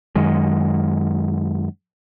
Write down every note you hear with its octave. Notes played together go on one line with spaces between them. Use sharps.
F#2 D#3 G#3